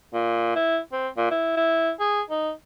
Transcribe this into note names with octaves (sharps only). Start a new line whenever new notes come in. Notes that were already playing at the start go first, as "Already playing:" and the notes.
A#2
E4
C4
A#2
E4
E4
G#4
D#4